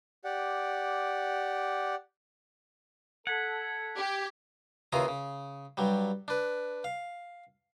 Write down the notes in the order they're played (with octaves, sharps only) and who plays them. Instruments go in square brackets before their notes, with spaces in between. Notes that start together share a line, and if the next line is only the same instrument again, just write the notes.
[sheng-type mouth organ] G4 D5 F#5
[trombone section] A4 [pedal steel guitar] F#5 [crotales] G#6 B6
[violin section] G4
[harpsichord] D#2 C#3 E3 F4 G#4 A#5
C#3
G2 F#3 G3
D4 B4
F5